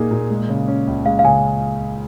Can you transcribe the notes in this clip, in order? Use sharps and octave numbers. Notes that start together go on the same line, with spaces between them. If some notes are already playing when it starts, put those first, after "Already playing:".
Already playing: A#2 A#3 D#4 G#4
A#2
G#3
C#3
C#4
C#2
G#3 F5
F5
C#3 G#5